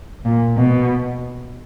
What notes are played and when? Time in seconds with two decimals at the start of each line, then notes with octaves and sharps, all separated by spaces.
0.25 A#2
0.57 B2